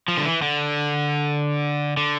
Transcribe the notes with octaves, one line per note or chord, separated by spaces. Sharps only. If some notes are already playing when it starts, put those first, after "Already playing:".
F3
D3
E3
D3
D3